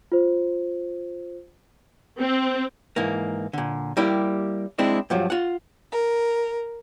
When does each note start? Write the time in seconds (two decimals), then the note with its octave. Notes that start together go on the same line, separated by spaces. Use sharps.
0.12 F4 C5
2.19 C4
2.96 G#2 E3 A#3
3.53 A#2 D3
3.97 G3 A#3 E4 G4
4.78 G#3 C4 D4 E4
5.10 G2 F3 F#3
5.30 F4 F#5
5.91 A#4